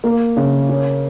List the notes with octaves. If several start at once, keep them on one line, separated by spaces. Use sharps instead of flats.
A#3
C#3
C#4